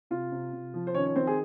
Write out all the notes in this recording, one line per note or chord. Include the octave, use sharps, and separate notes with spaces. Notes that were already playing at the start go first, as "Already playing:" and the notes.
C3 F4
C3
C3
F3
C5
D#3 C#4 C#5
C#5
D#3 C4 C5
G#4